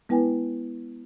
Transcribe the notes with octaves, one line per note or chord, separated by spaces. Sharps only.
G#3 B3 E4 B4 G5 G#5